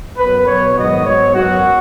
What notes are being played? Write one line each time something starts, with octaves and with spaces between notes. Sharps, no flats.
F#2 F#3 B3 B4
B2 F#3 B3 C#5
G#2 D#3 F#3 B3 D#5
G#2 F#3 B3 C#5
F#2 F#3 B3 F#4